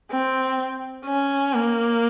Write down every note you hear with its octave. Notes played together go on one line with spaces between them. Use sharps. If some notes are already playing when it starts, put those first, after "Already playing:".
C4
C#4
A#3